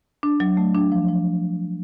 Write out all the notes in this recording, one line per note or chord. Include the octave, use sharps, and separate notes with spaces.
D4
F#3
A3
D4
F3
F3